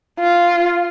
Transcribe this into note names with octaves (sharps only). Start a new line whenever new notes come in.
F4